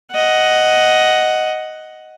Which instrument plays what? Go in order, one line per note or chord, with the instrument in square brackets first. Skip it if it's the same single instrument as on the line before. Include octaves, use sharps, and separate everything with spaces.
[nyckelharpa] D#5 F#5